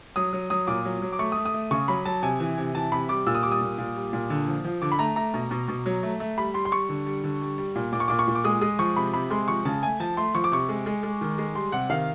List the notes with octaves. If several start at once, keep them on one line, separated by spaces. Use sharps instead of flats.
F#3 D#6
F#3
F#3 D#6
A#2 D6
F#3
F#3
D6
A3 C#6
D#6
A3
D#6
A3
C#3 C#6
F#3 B5
F#3 A5
C3 G#5
E3
C3
E3 A5
C3 B5
G3 D6
A#2 E6
D#6
G3 D6
D#6
A#2
A#2
G3
A#2
D3
F3
F3
D3 D6
B5
A3 A#5
A3 A#5
B2
B2
B2
F#3
A3
A3
G3 B5
G3 C6
C6
G3 C#6
D3
G3
D3
G3
G3
A#2
A#2 D6
C#6
A#2 D6
C#6
A#2
D6
G#3 D#6
G#3 D#6
F3 C#6
C3 B5
C3 B5
G#3 C6
F3 C#6
C#3 A5
A3 G#5
F3 A5
A3 C6
F3 C#6
D6
C3 C#6
G#3
G#3
G#3
D#3
G#3
G3 C6
C3 F#5
D#3 F5